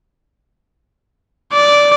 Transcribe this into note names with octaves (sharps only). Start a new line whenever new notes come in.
D5